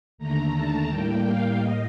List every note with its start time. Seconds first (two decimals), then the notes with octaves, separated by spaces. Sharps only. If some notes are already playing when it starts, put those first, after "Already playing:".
0.18 D#2 D3 A3 A#5
0.53 A5
0.88 A2 G3 A#3 G5
1.23 F5
1.57 A2 D#5